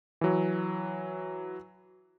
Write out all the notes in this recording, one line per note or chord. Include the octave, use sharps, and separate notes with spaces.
E3 F#3